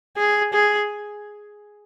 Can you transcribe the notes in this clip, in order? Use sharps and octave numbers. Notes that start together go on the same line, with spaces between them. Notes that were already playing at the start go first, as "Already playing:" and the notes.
G#4
G#4